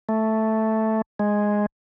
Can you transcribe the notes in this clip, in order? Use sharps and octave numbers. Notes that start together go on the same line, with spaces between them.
A3
G#3